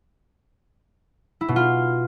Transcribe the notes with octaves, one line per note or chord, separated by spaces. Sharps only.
E4
B2
F4